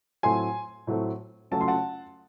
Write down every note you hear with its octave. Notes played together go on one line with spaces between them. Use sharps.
A2 F#3 A3 C4 G#5 C6
A2 F#3 A3 C4
C#3 F#3 A3 C#4 A5
C6
F#5 A5